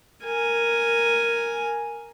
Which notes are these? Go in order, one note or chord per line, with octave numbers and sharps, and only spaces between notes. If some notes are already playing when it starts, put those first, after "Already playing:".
A#4 G#5